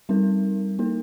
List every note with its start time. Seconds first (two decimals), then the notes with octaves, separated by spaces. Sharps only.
0.09 G3 C4 D#4 A#4
0.79 A#3 D#4 A#4